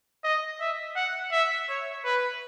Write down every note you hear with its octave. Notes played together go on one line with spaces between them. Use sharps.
D#5
E5
F#5
E5
C#5
B4